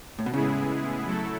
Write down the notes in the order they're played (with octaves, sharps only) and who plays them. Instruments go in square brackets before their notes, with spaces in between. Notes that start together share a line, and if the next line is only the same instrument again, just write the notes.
[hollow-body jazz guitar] A2
B2
[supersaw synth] A2 G#3 B3 E4 G#4 [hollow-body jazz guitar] C#3
[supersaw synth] F#3 A3 E4 A4